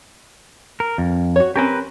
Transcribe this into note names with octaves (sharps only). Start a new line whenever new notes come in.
A#4
F2
F#4 C#5
C4 C#4 G4 A#4 B4